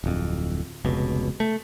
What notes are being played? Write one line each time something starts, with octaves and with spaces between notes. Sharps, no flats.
D1 F2
F1 C#2 B2
A3